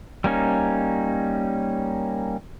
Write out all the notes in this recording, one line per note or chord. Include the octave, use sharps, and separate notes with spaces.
G3 A#3 C#4 D#4